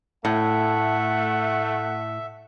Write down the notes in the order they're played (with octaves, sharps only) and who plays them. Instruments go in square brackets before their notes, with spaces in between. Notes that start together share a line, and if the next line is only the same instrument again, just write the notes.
[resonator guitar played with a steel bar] A2 [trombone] A3 [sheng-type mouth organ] E5 [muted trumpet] F#5